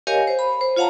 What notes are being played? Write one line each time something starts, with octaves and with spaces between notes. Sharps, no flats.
G4 A#4 C#5 D#5 F5 G#5
C5
B5
C5
F4 C#5 F5 F#5 A5 A#5